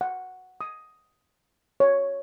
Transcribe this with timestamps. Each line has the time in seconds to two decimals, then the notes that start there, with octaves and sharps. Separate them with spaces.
0.01 F#5
0.61 D#6
1.80 C#5